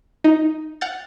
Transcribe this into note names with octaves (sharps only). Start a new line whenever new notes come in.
D#4
F#5 F6 G6 A6